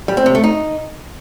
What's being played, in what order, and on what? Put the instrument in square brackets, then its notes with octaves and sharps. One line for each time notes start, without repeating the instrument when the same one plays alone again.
[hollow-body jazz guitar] G3
C4
C3
A3
D#4